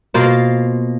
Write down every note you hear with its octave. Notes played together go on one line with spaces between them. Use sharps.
B2 A#3 F4 C5